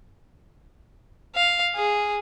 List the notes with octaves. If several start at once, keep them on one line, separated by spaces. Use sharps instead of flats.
F5
G#4